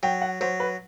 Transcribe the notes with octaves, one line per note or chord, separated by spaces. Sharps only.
F#3 G5
F#5
F#3 C5
B4